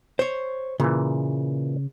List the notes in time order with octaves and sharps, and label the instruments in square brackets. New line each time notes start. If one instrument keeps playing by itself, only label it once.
[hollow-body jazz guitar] C5 C#5
[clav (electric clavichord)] A#2 E3 [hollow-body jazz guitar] C#3